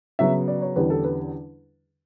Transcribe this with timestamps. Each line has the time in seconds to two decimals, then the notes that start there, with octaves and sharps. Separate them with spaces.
0.19 C#3 F#3 B3 E5
0.48 D5
0.62 C#5
0.76 E2 D3 G3 C#4 B4
0.90 A4
1.04 B4